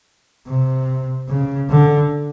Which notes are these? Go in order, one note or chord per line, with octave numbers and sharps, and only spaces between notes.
C3
C#3
D3